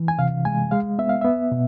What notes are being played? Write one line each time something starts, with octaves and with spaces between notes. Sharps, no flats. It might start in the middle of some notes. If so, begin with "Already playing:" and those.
Already playing: E3
G#5
C3 F5
G#3 G#5
G#3 F5
B3 E5
F5
B3 E5
B2